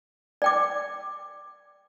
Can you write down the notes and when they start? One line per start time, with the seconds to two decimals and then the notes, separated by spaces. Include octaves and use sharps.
0.42 D5 G5 D6